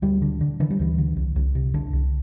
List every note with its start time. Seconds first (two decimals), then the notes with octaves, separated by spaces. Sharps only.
0.02 D2 G3
0.22 D3
0.41 D3
0.60 D3 E3
0.70 G3
0.79 D2 E3
0.98 D3
1.16 C2
1.36 C2
1.55 C3
1.74 C2 D3
1.93 C2